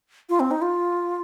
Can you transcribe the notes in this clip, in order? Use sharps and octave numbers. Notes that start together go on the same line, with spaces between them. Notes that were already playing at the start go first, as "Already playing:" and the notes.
F4
C4
D#4
F4